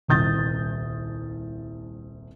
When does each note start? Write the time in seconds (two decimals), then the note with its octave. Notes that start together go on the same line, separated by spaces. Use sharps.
0.08 D#1 C2 D#6 G6 A6